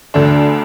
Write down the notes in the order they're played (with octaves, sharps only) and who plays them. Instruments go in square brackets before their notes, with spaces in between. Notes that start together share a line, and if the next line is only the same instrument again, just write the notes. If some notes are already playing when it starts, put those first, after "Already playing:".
[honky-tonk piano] D2 D3 A3 D4